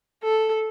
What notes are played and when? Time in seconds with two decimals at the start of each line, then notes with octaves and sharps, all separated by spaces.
0.23 A4